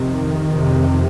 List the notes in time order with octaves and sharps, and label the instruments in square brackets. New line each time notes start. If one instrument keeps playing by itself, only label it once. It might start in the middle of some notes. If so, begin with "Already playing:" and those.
Already playing: [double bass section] F2 C3 D#3
F2 C3